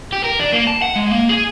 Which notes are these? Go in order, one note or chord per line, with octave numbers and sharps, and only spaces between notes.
G4
A#4
D4
A#3
A5
F#5
G#3
A#3
G#4